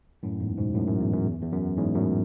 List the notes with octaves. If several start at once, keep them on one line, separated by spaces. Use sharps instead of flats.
F#2 A2
E2 G#2
G#2 B2
F#2 A2
F#2
E2
F#2
E2
E2
F#2
E2 G#2
F#2 A2